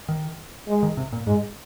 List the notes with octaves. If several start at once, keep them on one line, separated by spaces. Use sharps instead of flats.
D#3
G#3
D#3
C3
A#2
G#2 G#3